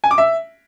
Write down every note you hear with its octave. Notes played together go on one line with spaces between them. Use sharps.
G#5
D6
E5